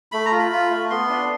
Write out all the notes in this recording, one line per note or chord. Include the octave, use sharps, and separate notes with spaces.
A3 B5
A#5
F4
B5
F4
A3
B3 C6
D4